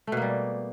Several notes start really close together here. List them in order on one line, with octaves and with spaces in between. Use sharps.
A3 B2 A#3 G3